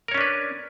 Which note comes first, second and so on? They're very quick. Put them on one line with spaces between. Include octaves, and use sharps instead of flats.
A#4 C#5 C#4 D4 B4